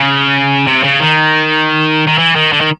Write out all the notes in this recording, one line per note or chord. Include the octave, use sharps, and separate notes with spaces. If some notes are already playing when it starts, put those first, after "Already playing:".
Already playing: C#3
C3
C#3
D#3
D#3
E3
D#3
D3
D#3